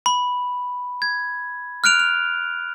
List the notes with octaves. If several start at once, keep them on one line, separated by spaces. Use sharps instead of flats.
B5
G#6
F6 F#6 D7 F7
F7